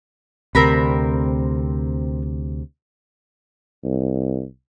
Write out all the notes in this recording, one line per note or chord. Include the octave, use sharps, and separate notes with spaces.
D2 C3 C4 A#4 B5
C2